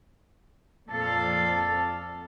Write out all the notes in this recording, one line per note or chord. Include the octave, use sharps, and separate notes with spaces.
F2 A#2 A4 D5 F5